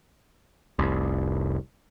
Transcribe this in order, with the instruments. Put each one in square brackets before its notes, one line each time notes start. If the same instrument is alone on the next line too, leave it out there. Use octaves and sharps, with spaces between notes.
[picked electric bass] F1 C2